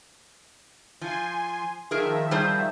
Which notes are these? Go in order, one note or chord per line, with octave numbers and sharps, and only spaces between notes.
F3 G#5 C6
D#3 F3 G#4 A#4 E5
G3 G#4 C5